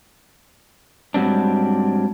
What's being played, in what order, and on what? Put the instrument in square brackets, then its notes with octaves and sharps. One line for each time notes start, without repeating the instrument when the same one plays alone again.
[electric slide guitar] G#2 F#3 G3 C4 D4